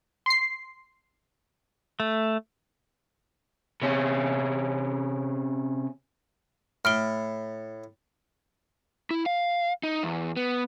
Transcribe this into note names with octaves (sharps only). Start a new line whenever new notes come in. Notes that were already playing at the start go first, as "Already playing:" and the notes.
C6 C7
A3
C3 C#4
A2 F6 D7 G7
E4
F5
D#4
E2
B3